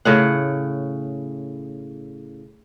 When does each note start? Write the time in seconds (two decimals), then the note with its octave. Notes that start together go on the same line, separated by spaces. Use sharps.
0.05 A2 C#3 F#5